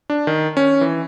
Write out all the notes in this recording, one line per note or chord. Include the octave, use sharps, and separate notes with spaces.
D4
D#3
C#4
E3